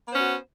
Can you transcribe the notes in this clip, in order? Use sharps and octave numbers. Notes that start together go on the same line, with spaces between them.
B3 C#4 F#4 C5